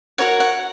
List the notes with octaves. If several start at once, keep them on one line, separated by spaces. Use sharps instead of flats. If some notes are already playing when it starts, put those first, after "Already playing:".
F#4 A#4 C#5 F#5
F#5